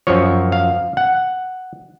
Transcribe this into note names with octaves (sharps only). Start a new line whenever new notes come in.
F#2 F3 C#5
F5
F#5